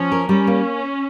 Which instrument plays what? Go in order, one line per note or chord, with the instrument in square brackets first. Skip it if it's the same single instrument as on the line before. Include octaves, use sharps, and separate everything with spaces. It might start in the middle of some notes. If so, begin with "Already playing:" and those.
Already playing: [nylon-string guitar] F3 [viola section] C#4
[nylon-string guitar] A#4
[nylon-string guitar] G3 [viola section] C#4
[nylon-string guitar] A#3